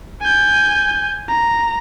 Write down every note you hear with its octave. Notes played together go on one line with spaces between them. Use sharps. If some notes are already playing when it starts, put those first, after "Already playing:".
G#5 G6
A#5